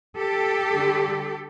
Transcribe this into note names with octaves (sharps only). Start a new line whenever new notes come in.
G4 A4
D3 G3